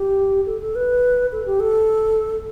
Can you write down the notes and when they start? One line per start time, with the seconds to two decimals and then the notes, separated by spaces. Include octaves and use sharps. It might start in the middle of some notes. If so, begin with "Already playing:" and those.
Already playing: G4
0.46 A4
0.61 A4
0.75 B4
1.32 A4
1.46 G4
1.60 A4